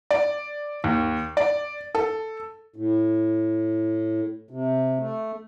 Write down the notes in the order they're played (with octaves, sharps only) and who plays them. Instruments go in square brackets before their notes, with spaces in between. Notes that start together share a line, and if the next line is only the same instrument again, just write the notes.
[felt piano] D5
D#2
D5
A4
[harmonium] A2
C3
A3